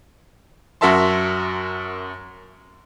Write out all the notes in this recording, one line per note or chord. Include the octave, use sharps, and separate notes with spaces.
F#2 F#4 A#4 E5 A5 C6